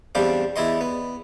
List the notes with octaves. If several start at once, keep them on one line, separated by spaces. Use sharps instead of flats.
E2 G3 C4 D4 G4 F5
E2 E4 D5 D#5 C6
B3